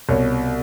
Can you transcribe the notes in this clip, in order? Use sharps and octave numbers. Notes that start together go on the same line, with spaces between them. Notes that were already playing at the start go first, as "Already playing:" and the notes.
C2 B2 C#5